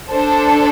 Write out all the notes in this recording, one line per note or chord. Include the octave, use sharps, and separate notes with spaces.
D4 A4 C5